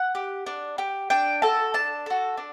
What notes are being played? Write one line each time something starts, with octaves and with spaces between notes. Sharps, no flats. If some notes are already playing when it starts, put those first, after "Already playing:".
Already playing: F#5
G4
D4
G4
D4 G5
F#4 A4 A5
D4 A5
F#4 A4
D4